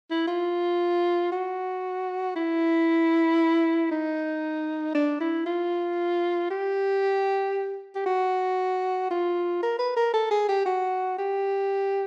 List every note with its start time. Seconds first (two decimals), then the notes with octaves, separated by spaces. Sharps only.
0.10 E4
0.28 F4
1.32 F#4
2.36 E4
3.91 D#4
4.95 D4
5.20 E4
5.46 F4
6.51 G4
7.96 G4
8.06 F#4
9.10 F4
9.63 A#4
9.79 B4
9.96 A#4
10.13 A4
10.31 G#4
10.48 G4
10.66 F#4
11.18 G4